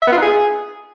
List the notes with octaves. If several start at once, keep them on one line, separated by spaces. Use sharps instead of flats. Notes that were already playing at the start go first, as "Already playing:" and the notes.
E5
B3
F4
D#4
G#4